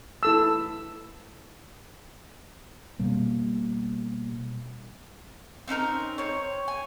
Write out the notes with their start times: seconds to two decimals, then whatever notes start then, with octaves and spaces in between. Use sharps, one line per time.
0.23 E4 A4 E6
3.00 B2 G3 A#3
5.68 C4 C#4 D#4 A#4
6.18 C4 C#5
6.68 G#5